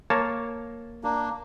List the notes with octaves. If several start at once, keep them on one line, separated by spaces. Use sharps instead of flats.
A#3 C#5 A5
A#3 D4